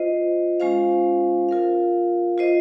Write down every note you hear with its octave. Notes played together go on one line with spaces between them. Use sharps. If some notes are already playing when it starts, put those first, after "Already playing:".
Already playing: F4 C5 D#5
G#3 C#4 F4 C5 F5
F4 A#4 F5
F4 C5 D#5